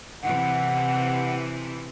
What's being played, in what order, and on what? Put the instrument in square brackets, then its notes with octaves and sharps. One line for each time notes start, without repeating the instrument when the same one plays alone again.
[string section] C3 E3 [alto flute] F#5